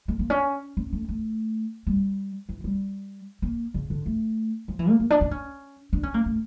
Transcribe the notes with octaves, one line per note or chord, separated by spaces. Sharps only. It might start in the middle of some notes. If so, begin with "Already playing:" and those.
A3
A#3
C#4
C#4
A3
A3
G3
E3
G3
A#3
C#3
D3
A3
F3
E3
A#3
A#3
D4
D4
C#4
D4
C#4
A#3
A3